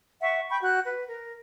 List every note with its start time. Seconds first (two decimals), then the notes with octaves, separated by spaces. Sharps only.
0.22 E5 F#5 C#6
0.49 G5 B5 C#6 G6
0.62 F#4 F#6 G6
0.86 B4
1.09 A#4